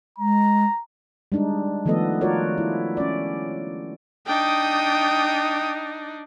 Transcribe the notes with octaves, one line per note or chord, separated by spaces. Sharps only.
G#3 A#5
G3 G#3 D4 D#4
D#3 F3 A3 B3 A4 D#5
F4 F#4 A#4 C#5 D5
E4
C#4 D5
D4 D#4 G5 D#6